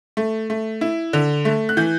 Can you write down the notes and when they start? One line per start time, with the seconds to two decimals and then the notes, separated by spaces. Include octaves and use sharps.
0.17 A3
0.50 A3
0.81 E4
1.13 D3
1.45 A3
1.69 F#6
1.77 E3 G6